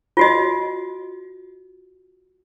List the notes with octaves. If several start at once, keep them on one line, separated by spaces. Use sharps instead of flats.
F4 F#4 D#5